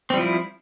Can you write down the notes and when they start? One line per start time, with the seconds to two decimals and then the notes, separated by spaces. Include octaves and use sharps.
0.10 C4
0.14 G3
0.17 F3
0.21 E4